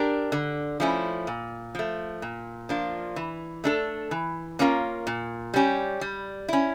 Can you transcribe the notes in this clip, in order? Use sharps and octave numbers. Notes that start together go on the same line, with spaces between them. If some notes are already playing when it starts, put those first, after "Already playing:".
Already playing: D4 G4 A#4
D3
F3 A3 C#4 E4
A#2
F3 A3
A#2
F3 A#3 D4 F4
E3
A3 D4 A4
E3
A#3 C#4 F4 A#4
A#2
G3 C#4 G4
G3
C#4 E4